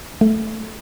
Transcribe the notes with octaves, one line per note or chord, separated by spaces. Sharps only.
A3